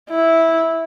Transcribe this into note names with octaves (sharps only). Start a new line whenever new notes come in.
E4